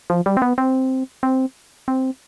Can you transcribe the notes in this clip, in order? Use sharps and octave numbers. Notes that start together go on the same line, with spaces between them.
F3
G3
C4
B3
C4
C4
C4